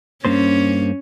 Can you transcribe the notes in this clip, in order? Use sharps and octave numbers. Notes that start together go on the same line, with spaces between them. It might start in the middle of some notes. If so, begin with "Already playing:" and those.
G2 A#3 C#4 C5